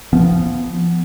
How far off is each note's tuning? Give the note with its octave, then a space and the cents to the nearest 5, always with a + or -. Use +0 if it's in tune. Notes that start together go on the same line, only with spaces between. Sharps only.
F3 -20 B3 +0